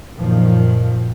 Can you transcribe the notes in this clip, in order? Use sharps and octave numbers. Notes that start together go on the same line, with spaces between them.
F#2 A#2 D#3 F3